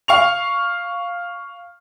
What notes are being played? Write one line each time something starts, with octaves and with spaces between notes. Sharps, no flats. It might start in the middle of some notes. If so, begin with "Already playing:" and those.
F5 C#6 F7